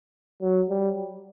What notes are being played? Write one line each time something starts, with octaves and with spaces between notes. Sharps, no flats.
F#3
G3